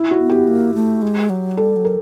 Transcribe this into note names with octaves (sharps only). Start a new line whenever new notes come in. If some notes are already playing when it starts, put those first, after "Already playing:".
Already playing: E4
F#4
B3
G4
A#3
A3
G#3
F#3
G3 A4
F#3
A#4